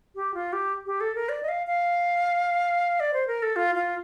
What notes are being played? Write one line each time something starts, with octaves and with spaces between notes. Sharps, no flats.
G4
F4
G4
G4
A4
A#4
D5
D#5
F5
F5
D5
C5
A#4
A4
F4
F4